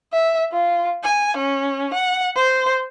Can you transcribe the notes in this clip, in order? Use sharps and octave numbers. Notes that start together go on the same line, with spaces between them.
E5
F4
G#5
C#4
F#5
C5